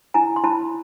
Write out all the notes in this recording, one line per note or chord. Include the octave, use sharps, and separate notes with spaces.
E4 G#5 A#5
C6
E4 A5 B5